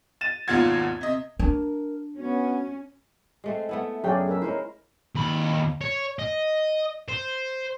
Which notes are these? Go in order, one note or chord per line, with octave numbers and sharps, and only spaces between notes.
A6 D#7 E7
G#1 D#2 B2 F4 F#5 G#6
C3 D#5
D4 A#4
B3 C#4 F#4
G#3 A3 C4
A3 B3 E4
F#2 C#3 F#4 G#4 D5 G5
G#4 A#4 E5
G#3 C#4 E4 A#4 C5
D#2 B5
C#5
D#5
C5